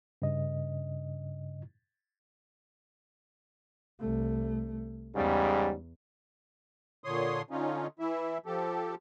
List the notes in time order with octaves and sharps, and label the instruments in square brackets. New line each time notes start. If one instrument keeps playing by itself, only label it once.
[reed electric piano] G2 C#3 D#5
[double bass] C2 A3
[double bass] E2 [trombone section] G#2 C#3 G3
[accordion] A#2 D3 C#5 C6 D#6
D3 C#4 D#4 F4
E3 E4 E5
F3 G4 A4